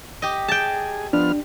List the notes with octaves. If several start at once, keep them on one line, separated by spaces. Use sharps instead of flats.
G4 D#5
G#4 G5 A5
F3 B3 D4 F6